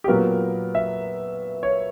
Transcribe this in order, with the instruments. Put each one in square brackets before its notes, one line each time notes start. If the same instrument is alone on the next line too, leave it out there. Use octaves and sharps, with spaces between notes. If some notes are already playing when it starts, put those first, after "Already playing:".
[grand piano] G4
A#2 F#3 B3 A#4
E5
C#5